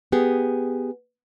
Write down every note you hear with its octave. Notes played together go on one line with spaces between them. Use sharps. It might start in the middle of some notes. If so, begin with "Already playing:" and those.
B3 G4 G#4